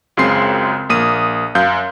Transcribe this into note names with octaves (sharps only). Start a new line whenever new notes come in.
C#2 F#2 C#3 C4 C6 C7
A#1 A#3 D#6 D#7
F#2 F5 G6